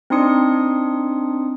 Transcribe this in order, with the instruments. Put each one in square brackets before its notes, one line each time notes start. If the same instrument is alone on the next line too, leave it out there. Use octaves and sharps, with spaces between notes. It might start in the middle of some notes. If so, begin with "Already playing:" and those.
[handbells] C4 D4 D#4 C6 D#6 C#7